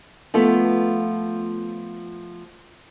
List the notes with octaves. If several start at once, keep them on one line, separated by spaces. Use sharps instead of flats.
F3 A3 B3 F4